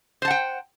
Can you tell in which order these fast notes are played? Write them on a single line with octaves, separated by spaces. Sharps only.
C5 A5 F#5 G5